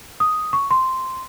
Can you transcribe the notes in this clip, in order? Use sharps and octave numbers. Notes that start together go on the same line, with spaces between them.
D#6
C#6
C6